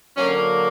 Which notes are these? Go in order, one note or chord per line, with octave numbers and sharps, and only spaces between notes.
D3 F#3 A#3 C#4